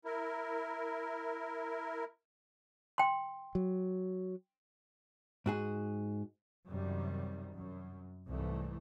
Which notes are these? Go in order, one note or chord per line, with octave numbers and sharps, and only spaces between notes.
E4 A#4
G5 C6
F#3
G#2 F#4 G#4
F#2 C3 D#3 G3
F#2
C2 G#2 E3 A3